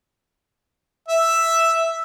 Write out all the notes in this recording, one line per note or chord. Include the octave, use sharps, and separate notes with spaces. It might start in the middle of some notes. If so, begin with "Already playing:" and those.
E5